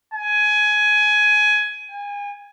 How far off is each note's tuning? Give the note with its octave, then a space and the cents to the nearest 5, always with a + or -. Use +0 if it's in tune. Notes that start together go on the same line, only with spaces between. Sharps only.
G#5 +15
G#5 -35